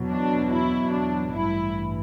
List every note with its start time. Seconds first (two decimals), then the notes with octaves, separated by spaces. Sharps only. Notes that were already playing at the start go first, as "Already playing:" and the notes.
Already playing: E2 B2 F#3
0.09 D4
0.51 E4
0.92 D4
1.35 A1 G2 E3 E4